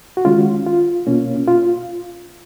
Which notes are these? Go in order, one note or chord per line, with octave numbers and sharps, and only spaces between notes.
F#4
D#3 G#3 C#4 F4
F4
B2 A#3 C#4
F4